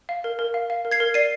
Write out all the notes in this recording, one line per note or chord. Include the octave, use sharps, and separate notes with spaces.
F5
A#4
A#4
F5
F5
A#4
G#6 C7
A#4
D5 C7 D#7